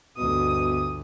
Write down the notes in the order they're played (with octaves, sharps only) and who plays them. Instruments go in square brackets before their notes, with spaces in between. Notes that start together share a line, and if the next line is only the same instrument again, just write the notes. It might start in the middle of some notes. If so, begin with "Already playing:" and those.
[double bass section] G1 D2 [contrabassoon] B2 [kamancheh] D#6